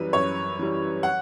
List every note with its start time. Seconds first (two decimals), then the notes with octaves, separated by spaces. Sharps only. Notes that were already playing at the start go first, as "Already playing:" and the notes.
Already playing: F#2 E3 G3 B4
0.13 F#2 C#5
0.59 E3 G3
1.03 F#5